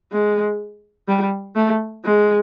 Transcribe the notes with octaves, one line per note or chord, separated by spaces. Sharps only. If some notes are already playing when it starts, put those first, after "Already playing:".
G#3
G3
A3
G#3